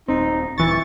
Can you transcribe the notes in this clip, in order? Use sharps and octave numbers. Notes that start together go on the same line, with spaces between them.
D#1 C4 D#4
D#1 E3 C#6 A6